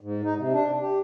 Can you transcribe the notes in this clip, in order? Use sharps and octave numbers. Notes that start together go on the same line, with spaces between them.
G#2
D#4
C3
D4
G4